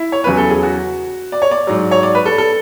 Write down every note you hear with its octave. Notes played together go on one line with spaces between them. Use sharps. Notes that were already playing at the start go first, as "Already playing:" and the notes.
Already playing: E4
C#5
E2 C#3 F#3 B4
A4
G#4
F#4
D5
C#5
D5
G#2 F#3
C#5
D5
B4
A4
A4